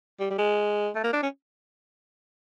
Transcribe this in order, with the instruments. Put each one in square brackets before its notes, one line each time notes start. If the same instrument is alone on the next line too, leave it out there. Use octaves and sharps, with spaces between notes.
[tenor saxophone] G3
G3
G#3
A3
A#3
D4
C#4